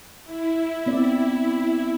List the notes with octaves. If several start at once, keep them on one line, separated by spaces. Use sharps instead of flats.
E4
B3 C4 D5